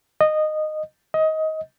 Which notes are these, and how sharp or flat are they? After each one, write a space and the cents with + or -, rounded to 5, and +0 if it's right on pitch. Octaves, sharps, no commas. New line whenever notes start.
D#5 -15
D#5 +20